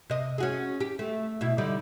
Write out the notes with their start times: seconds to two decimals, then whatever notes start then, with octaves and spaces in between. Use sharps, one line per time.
0.10 C3 D#5
0.38 C#4 F#4 G#4
0.81 G4
0.99 A3
1.41 B2 E4
1.58 D3 G3 D#4